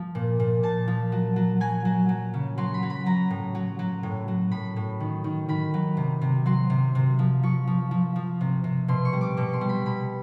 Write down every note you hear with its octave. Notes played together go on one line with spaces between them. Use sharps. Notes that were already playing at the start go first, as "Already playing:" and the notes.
Already playing: F3
A#2
A#2
A#2 A5
F3
F#3
F#3
F#3 G#5
F#3
F#3
C#3
F#3 C6
B5
F#3
B5
F#3 A#5
A2
F#3
F#3
A2
F#3
A2 B5
A2
D#3
D#3
D#3 B5
F#3
C3
C3
F#3 C6
C3
C3
F3
F3 C#6
F3
F3
F3
C3
C3
B2 C6
C#6
G3
D6
B2 C#6
C6
G3
B5
B2 B5